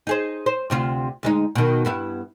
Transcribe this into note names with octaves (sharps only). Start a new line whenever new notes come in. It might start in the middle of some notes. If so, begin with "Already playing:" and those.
D#4 G#4 C5
C5
D2 C3 F4
D2 G#3 D#4
B2 D#3
G2 B3 E4